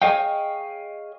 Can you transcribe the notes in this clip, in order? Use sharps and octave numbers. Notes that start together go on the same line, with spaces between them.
G#4 C#5 D#5 F5 G5